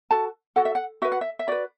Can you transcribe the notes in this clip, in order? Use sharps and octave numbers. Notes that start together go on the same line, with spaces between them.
F#4 A4 A5
F#4 A4 F#5
E5
F#5
F#4 B4 E5
F#5
E5
E5
F#4 B4 D5